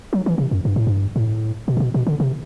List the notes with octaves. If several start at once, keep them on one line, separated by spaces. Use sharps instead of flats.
F#3
E3
C3
F#2
G2
A2
G2
A2
B2
A2
B2
B2
D3
C3